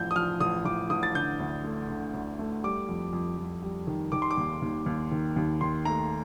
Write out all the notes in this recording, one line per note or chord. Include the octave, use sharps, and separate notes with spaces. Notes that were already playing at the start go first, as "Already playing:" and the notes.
Already playing: A1 F3 G6
D#6
F3 F6
A1 D#6
A1 D6
A1 D#6
A6
D3 G6
D2
A3
D3
D2
A3
G3 D6
F2
F2
F2
G3
D#3
D#3 D6
C6
D6
D#2
D#2
D#2
D#3
D#2
D#3 C6
A3 A#5